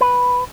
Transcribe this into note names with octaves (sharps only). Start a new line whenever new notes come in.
B4